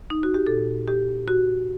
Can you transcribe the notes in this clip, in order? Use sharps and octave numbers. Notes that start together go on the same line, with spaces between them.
D#4
F#4
G4
A#2 A4
G4
F#4